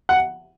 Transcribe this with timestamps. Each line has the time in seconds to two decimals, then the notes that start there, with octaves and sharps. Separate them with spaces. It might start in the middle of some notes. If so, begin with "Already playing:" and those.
0.09 F#5